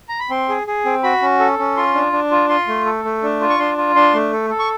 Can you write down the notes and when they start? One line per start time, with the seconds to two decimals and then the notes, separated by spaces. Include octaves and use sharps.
0.09 A#5
0.20 B5
0.30 C4 C6
0.49 G#4
0.67 G#4
0.85 C4
1.03 F#4 B5
1.22 C#4
1.40 A4
1.59 C#4
1.77 F4 C6
1.95 D4
2.13 D4
2.31 F4
2.49 F4 C6
2.68 A3
2.86 A4
3.04 A3
3.23 D4
3.41 F4
3.50 C#6
3.59 D4 C6
3.78 F4
3.95 D4 C6
4.14 A3
4.32 A4
4.50 A4
4.59 C#6